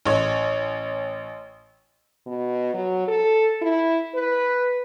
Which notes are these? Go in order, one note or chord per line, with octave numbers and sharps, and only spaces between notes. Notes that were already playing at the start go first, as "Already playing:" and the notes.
A1 C#5
B2
F#3
A4
E4
B4